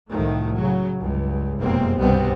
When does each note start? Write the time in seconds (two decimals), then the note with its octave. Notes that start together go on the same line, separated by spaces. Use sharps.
0.11 C2 A2 D#3 F3 A3
0.56 C#3 F#3
1.00 C#2 G2
1.61 F1 F#2 B2 G#3 A#3 C4
2.00 C2 G2 B2 G3 B3 C4